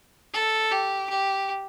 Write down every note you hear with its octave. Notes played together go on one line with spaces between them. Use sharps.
A4
G4
G4